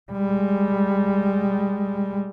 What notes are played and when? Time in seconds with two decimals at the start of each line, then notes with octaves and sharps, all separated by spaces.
0.12 G3 G#3